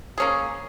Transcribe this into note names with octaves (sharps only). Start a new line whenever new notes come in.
A#3 C#4 G#4